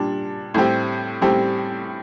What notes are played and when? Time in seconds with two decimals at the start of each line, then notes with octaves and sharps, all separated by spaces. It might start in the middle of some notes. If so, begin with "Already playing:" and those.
Already playing: A#2 G3 D4
0.54 A2 G3 C4 G4
1.22 A2 G3 C4 G4